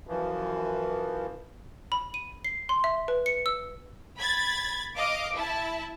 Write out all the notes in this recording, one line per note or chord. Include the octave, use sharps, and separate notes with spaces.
F#2 E3 F3
B5
D#7
C7
C6
E5
B4
C#7
E6
B5 G#6 A6
D#5 F5 D6
E4 A5